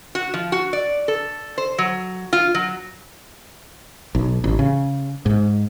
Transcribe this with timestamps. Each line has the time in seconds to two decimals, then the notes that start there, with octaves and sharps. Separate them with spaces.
0.15 F#4
0.34 F3
0.52 F#4
0.73 D5
1.08 A4
1.58 C5
1.78 F#3
2.33 F4
2.54 F#3
4.15 B1
4.44 A1
4.59 C#3
5.26 G#2